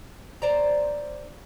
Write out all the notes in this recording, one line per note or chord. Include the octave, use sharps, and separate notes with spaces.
C5 D5 A#5